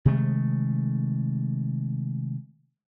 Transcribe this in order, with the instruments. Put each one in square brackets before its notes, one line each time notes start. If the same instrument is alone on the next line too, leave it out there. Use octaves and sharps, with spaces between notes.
[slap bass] C3 D#3 G#3 A3